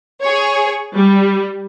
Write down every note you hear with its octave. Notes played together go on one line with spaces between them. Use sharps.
G#4 C#5
G3